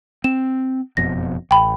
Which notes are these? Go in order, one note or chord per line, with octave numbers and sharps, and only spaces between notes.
C4 E7
F#1 F2 B2 A#6
A1 G5 B5